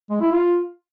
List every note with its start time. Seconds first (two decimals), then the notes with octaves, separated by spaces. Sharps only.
0.10 G#3
0.21 E4
0.32 F4